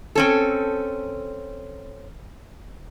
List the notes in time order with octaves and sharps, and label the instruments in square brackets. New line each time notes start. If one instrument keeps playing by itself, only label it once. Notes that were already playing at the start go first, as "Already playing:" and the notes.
[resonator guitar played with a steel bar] C4 C#4 A4